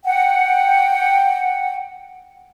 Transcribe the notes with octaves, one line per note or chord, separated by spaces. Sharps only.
F#5 G5